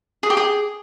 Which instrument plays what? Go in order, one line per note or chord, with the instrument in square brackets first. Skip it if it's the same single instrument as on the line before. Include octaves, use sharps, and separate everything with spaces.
[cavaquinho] G#4
G4
G#4